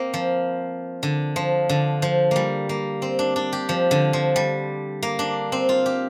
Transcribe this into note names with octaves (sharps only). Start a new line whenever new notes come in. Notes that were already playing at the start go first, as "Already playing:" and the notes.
Already playing: A#3 C4
F3
D3
F3
D3
F3
G3 A#3
A#3
C4
D4
D4
G4
F3
D3
F3
G3
A#3
D4
C4
F4
G4